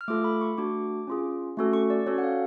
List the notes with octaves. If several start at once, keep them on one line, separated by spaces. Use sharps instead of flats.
F6
A3 F4 A4 D6
B5
C#6
A3 D4 F#4 D6
C#4 F4 G#4
A3 C#4 F#4 A4
C#6
D5
C#4 F#4 A4 C#5
F#5
F5